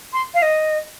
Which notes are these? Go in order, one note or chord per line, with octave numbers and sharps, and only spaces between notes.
C6
F5
D#5